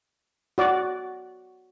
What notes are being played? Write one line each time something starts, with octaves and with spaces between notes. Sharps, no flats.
F#4 D5